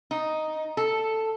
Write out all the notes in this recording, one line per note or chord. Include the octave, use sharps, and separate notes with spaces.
D#4
A4